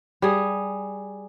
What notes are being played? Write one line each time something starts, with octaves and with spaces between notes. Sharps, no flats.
G3 G#4